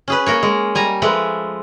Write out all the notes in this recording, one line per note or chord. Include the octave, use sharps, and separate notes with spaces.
C#4 G#4 B4
A#3 A#4 C#5
G#3
G3 G#5 A#5
F3 G#3 A3 B4